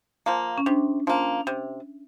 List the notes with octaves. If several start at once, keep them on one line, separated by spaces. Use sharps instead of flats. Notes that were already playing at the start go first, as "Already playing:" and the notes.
F3 A#3
C#4
C3 D4
F3 A#3
C3